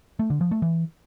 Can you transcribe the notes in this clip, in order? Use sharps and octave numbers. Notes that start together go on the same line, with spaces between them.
A3
D3
F3
A3
E3